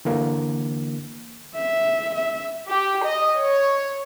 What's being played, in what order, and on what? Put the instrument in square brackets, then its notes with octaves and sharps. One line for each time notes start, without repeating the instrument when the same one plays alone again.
[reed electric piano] D3 E3 A#3
[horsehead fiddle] E5
E5
[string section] G4
D#5
C#5